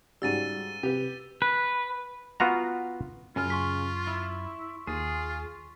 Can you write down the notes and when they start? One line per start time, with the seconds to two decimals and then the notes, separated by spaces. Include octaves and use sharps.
0.22 G#2 C#3 G3 F#4 E6 A6 D#7
0.83 C3 G4 B4
1.42 B4
2.40 B3 F4 F#4 A#5
3.36 F#2 C#3 F4 G#5 F6
3.50 C6 C#6 B6
4.07 E4
4.87 D#2 F4 G#4